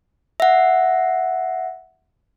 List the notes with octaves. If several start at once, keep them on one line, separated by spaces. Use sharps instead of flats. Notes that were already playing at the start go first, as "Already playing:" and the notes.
E5 F#5